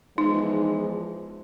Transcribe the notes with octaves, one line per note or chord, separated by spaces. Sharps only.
E2 F3 G#3 D#4